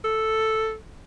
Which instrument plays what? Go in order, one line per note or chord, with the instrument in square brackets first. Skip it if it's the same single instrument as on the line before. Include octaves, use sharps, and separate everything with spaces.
[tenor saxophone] A4